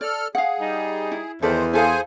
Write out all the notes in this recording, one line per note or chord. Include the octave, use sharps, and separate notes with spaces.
A4 D5 F6
G#4 F5 F#5
G3 D#4
E4
E2 D#3 A4 B4 C5 D5
E4 G#4 A4 C5 F5 G#5